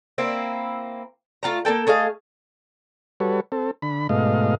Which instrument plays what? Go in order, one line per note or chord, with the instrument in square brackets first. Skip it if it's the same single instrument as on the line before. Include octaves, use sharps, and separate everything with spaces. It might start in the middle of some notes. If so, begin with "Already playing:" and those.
[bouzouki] A#3 C4 E4
A3 F4 F#5 A#5
A#3 B3 A4 G5
A3 G#4 D#5 F5
[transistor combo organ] G3 F#4 A4 B4 C#5
C4 A4
D3 B5
G#2 B2 A3 D#5 F5